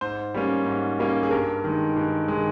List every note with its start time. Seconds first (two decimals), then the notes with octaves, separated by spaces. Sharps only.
0.01 G#2 C5
0.34 G3 A#3 C#4
0.66 G#2
0.99 G3 A#3 C#4
1.23 G#4
1.31 G2 A#4
1.64 D#3 G#3
1.96 G2
2.28 D#3 G#3